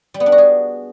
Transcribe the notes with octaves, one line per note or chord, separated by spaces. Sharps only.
G3
B3
D4
F#4
G#4